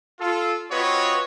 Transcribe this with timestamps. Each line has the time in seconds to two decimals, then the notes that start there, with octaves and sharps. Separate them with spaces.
0.20 F4 A4
0.71 C4 F4 F#4 B4 C#5 D#5